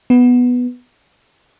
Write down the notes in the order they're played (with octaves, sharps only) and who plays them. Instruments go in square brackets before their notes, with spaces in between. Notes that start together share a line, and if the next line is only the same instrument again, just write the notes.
[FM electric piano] B3